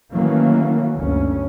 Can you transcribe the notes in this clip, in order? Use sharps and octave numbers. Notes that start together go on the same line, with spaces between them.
D#3 E3 F#3 A3 A#3 C#4
G1 D2 C#4